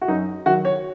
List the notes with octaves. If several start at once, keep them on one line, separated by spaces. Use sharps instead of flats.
F#4
F#2 D#4
D#3 F#3 F#4
C#5